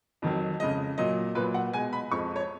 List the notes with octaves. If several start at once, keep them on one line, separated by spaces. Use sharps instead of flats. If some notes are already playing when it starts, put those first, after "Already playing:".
F2 D#3 F#3
F2 C#3 G#3 D#5
A#2 F#3 D#5
A#2 F#3 B4
F#5
B2 G#3 G#5
B5
F2 F3 G#3 C#6
C#5